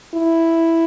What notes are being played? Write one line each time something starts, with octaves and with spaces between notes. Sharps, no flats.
E4